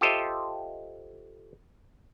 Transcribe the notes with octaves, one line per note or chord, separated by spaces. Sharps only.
F4 G4 A4 C5 D#5 E5